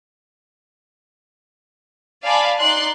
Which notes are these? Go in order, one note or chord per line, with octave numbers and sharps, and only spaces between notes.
D5 F5 G#5 A5 B5 D6
D#4 D5 C6 F#6 C7